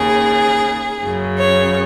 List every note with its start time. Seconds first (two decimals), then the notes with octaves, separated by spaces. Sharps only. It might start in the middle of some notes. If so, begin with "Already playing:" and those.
Already playing: D#2 C#3 G#4
1.03 F#2 C#3
1.38 C#5